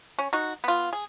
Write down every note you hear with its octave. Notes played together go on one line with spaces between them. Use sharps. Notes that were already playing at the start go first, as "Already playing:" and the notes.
C#4
D#4 F#4
B3 F4
G#4